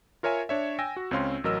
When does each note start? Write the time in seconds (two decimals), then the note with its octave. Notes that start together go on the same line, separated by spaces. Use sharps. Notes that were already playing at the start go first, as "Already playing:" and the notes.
0.23 F4 A#4 C#5 E5 G#5
0.49 D4 C#5 E5
0.79 G5 G#5 E6 A#6
0.96 F#4
1.11 C#2 C4 C#4 F5 C6
1.44 A1 F#3 A#4 D#5 E6